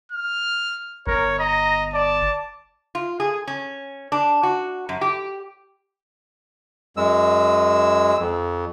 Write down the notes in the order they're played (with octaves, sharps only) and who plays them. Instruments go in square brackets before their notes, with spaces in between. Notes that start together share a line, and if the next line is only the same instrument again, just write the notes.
[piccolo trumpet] F6
[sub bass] G1 [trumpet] A#4 [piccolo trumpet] C#5
[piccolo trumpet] D#5 [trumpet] A#5
[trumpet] D5 [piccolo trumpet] A5
[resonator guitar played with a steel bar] F4
G#4
C#4
D4
F#4
F#2
G4
[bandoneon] F#2 G#3 E6
F2